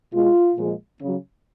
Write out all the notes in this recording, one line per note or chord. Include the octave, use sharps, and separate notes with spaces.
B2 G#3 F4
A#2 F3 G#3
C#3 F#3